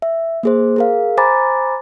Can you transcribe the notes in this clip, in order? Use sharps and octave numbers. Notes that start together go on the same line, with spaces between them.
E5
A#3 G#4 C5
G#4 A#4 F5
C5 G#5 A#5 B5 D6 A6